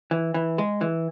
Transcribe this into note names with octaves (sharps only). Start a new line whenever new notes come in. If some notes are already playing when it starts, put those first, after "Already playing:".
E3
E3
G#3
E3